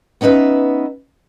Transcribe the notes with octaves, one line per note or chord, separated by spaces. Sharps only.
B3 C#4 D#4 B4 E5